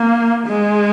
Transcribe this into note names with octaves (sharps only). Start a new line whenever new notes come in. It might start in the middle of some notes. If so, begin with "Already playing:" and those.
Already playing: A#3
G#3